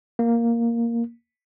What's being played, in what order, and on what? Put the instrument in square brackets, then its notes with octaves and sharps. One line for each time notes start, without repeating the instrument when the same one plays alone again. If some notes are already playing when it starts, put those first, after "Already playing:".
[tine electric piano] A#3